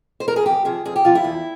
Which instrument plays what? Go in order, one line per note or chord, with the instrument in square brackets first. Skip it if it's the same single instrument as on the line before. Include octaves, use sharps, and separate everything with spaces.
[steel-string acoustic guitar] C5
A#4
G#4
F2 G4
C3 F3 G#4
F2 G#4
G4
C3 F3 F4
E4
E2